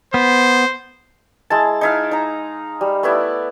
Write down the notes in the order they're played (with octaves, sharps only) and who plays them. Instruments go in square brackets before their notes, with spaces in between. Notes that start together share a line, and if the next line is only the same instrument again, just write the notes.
[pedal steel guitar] B3 [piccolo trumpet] C5
[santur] G#3 E4 A5
D#4 E4 F5
D#4 A#5
G3
A3 B3 E4 D5